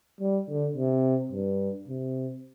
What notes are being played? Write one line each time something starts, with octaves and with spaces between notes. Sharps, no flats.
G3
D3
C3
G2
C3